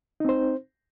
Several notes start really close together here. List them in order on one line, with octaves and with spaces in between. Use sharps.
D#4 C4 C5